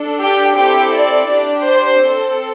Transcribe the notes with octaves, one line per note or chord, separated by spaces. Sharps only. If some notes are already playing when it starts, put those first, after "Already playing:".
Already playing: D4 A4
G4 G5
C4 E4 G4 A4 G5
D5
D4 G4
C5
C4 A4